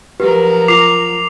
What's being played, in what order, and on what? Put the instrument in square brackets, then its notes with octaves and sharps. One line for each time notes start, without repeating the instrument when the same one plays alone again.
[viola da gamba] F3 F#3 A#4 [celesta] F#4 G4 B4
[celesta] F4 [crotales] D6 C7 F7